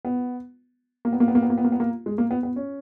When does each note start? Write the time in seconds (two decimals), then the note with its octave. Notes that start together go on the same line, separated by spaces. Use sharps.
0.05 B3
1.05 A#3
1.13 B3
1.20 A#3
1.28 B3
1.35 A#3
1.43 B3
1.50 A#3
1.58 B3
1.64 A#3
1.72 B3
1.80 A#3
2.06 G#3
2.18 A#3
2.31 B3
2.43 B3
2.56 C#4